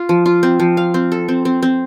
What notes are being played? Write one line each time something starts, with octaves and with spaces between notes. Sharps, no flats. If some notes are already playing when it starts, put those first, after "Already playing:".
Already playing: F4
F3
F4
C4
F3
F5
C4
A4
C4
C4
C4